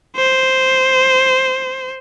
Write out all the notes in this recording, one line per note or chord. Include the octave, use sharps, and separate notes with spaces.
C5